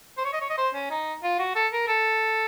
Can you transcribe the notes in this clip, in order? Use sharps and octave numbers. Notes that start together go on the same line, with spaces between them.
C5
C#5
D#5
C#5
D#5
C5
C#4
D#4
F4
F#4
A4
A#4
A4